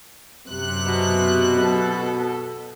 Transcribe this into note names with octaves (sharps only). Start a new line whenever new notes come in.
F#2 C3 F#6
B2
A4